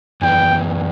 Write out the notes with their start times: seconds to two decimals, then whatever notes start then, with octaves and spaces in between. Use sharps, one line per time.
0.22 F#2 E3 B3 G5